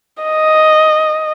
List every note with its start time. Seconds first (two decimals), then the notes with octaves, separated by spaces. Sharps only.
0.23 D#5